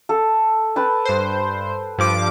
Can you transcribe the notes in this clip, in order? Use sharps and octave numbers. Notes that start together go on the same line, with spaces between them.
A4
B4 G5 A5
G2 C5
G2 F3 D6